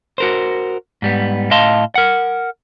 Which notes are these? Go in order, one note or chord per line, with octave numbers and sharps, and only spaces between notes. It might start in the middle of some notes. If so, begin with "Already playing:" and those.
F#4 A#4 C5
G#2 G3 B3
A2 D#5 F5 A5 C6
A#4 F#5